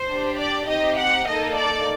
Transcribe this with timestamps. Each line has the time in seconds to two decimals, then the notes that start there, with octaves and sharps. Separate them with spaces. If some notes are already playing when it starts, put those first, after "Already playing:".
Already playing: C5
0.09 D4 G4
0.38 D5
0.67 C4 D#4 G4 D#5
0.98 F#5
1.27 A#3 D#4 A4 D#5
1.56 D5